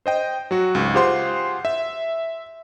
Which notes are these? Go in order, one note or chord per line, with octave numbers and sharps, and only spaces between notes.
C5 D#5 G5
F#3 F#4
C#2 G#2
F4 G4 G#4 C5 F#5 C6
E5